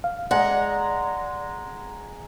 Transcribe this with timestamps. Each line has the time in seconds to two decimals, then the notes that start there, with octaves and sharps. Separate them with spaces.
0.04 F5
0.31 G#3 D5 F#5 A#5